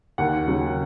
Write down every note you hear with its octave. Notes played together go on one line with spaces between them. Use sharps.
D#2 F#5
C#3 F#3